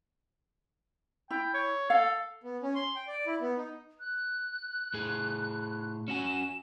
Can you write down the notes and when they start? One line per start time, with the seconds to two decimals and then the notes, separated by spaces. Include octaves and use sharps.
1.30 E4 G5
1.54 C#5
1.90 A4 F5
2.44 B3
2.63 C#4
2.75 C6
2.96 G5
3.08 D5
3.27 E4
3.41 B3
3.58 D#4
4.00 F#6
4.94 A2 G#4
6.08 C#4 F#4 G#5 E7